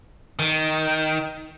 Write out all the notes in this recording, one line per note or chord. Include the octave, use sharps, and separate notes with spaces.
D#3